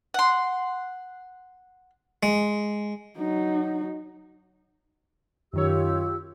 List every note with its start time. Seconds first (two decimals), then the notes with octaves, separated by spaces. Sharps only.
0.14 F#5 C6
2.23 G#3
3.17 F#3 D#4
5.53 F#2 D#3 F4 G4 C#5 E6